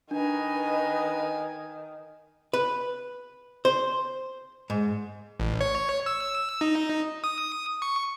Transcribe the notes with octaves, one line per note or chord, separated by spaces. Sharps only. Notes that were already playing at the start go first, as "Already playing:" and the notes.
D#3 D4 B4 D#5 G#5 A#5
B4
C5
G#2
A1
C#5
E6
D#4
D#6
C#6